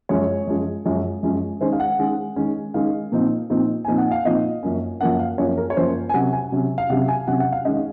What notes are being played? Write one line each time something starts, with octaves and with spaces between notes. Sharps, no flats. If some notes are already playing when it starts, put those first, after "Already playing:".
F#2 F3 G#3 C#4 C#5
F#2 F3 G#3 C#4
F#2 F3 G#3 C#4
F#2 F3 G#3 C#4
D#3 G#3 C#4 C5
F5
F#5
D#3 G#3 C#4
D#3 G#3 C#4
D#3 G#3 C#4 F5
A#2 F3 C4 D#4
A#2 F3 C4 D#4
A#2 F3 C4 D#4 G#5
F#5
F5
A#2 F3 C4 D#4 D#5
F#2 F3 A#3 C#4
F#2 F3 A#3 C#4 F#5
F5
F#2 F3 A#3 C#4 C#5
A#4
C#5
F#2 F3 A#3 C#4 C5
G#5
C3 F#3 C#4 F#5
G#5
C3 F#3 C#4
F5
C3 F#3 C#4 F#5
G#5
C3 F#3 C#4 F#5
F#5
F5
D#3 G#3 C#4 D#5